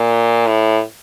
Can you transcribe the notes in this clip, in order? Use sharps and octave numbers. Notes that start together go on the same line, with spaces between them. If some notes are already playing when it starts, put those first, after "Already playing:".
Already playing: A#2
A2